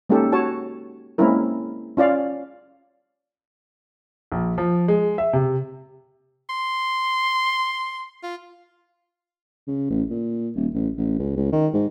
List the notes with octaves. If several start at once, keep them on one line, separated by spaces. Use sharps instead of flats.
G#3 A#3 C#4 D#4 G4 A4
F#4 C#5 A5
G#3 A#3 C4 C#4 E4 A#4
C#4 F4 D5 F5
A#1
F3
G#3
E5
C3
C6
F4
C#3
A1
A#2
D#1
A1
A1
C#2
C#2
D#3
G#2